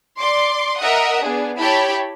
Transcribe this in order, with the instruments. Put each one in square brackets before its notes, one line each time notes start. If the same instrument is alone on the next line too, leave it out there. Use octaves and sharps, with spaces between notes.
[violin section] D5 C6 D6
A#4 D#5 E5 F#5 D#6
B3 D4 G#4
E4 G4 C#5 G5 A5 B5